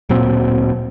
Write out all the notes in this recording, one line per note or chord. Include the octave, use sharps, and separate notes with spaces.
D1 A#2 F#3 C4